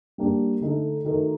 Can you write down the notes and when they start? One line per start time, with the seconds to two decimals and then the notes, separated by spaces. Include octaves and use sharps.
0.18 G3 A#3 D4 G4
0.61 D3 A3 D#4 A4
1.04 D#3 A3 D#4 F#4 A#4